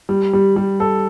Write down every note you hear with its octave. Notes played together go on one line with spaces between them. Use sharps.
G3
G3
G3
A4